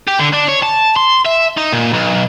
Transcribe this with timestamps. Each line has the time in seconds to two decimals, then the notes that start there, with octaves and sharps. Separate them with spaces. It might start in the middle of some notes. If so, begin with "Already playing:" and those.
0.08 G4
0.20 D3
0.34 D4
0.49 C#5
0.63 A5
0.97 C6
1.26 E5
1.58 D#4
1.73 A#2
1.93 B1